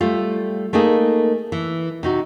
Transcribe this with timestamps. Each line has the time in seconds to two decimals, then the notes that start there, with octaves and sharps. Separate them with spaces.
0.01 G3 A3 F4
0.73 A3 A#3 D#4 G#4
1.52 E3
2.03 C3 D#4 F#4